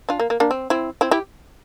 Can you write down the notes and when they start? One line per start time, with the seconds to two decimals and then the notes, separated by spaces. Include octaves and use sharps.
0.09 D4 F4
0.20 A#3
0.30 A#3
0.40 A#3 D4
0.51 C4
0.70 C4 E4
1.01 C4 E4
1.11 E4 G4